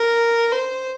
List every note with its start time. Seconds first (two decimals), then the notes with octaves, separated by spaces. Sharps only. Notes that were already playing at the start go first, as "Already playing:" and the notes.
Already playing: A#4
0.52 C5